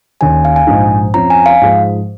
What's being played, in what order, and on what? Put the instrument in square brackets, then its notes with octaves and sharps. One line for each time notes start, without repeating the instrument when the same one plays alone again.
[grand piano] D#2 D#3 C#4 [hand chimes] G#5
[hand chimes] F5
G#5
[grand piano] A#1 G#2 F3 G#3 D#4
[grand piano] F2 F3 C#4 [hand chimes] A#5
[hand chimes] G#5
F5
[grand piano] G#2 F3 G#3